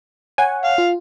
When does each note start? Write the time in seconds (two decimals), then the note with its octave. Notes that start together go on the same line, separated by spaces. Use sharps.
0.38 C#5 F#5 G#5
0.64 F5
0.78 F4